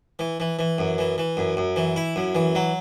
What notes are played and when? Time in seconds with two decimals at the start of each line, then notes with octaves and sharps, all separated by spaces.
0.19 E3
0.40 E3
0.59 E3
0.78 F#2
0.98 E3
1.18 E3
1.37 F#2
1.57 F#2
1.76 E3
1.96 E4
2.16 F#2
2.35 E3
2.55 F#3